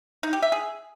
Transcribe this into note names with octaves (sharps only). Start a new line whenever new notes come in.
D#4
G4
E5
G#4